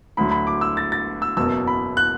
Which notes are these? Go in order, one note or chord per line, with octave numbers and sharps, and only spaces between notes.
D2 D3 F#3 B5
B5
D6
E6
A6
A6
E6
F#1 E2 B2 F#3 E6
B5
F#6